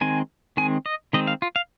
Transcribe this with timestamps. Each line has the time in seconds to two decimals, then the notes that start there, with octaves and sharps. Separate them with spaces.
0.01 D#3 G#3 C4 G#5
0.57 D#3 G#3 C4 G#5
0.86 D#5
1.13 D#3 G#3 C4 D#5
1.27 F5
1.42 F4
1.56 F5